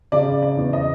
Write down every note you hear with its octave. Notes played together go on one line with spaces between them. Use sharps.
C#3 D5
D5
E2
D#5